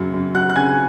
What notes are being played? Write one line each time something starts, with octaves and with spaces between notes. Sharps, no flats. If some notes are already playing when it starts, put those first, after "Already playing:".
Already playing: F#2 C#3 F#3
F#2
F#3 F#5 F#6
F#6
C#3 G#5 G#6